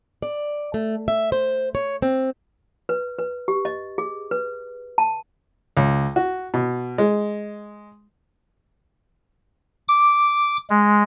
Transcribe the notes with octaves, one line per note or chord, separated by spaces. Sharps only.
D5
A3
E5
C5
C#5
C4
B4
B4
G4
D#5
G#4
B4
A5
C#2
F#4
B2
G#3
D6
G#3